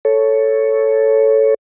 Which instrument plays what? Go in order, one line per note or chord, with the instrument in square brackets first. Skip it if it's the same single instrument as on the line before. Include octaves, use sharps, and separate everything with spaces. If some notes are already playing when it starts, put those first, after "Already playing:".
[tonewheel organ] A4 C#5